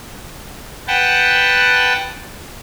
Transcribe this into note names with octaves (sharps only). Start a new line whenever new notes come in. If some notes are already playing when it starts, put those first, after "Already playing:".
B4 F#5 G5 A5